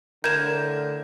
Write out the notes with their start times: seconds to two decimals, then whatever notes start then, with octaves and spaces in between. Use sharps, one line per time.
0.24 A2 D3 A#4 G6 G#6 E7